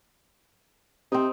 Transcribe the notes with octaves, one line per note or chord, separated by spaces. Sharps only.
C3 C4 D#4